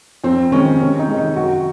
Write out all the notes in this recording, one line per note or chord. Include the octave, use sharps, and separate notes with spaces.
F2 C4
D#3 G#3 C#4
C3 C#4
D#4
D#3 G#3
D#4
F#2 F#4